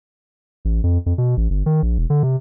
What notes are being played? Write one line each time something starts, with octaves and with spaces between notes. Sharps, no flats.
A1
F2
F2
B2
A1
G1
D#3
A#1
E1
D3
C3